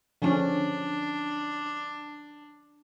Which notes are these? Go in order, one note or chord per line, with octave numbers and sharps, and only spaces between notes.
D3 F3 C#4 D4